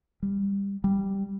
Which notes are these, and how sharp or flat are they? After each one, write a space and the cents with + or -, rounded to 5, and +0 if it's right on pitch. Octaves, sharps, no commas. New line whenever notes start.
G3 +20
G3 +0